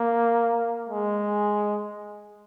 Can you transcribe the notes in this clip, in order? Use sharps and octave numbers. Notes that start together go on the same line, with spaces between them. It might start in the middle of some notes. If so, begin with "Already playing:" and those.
Already playing: A#3
G#3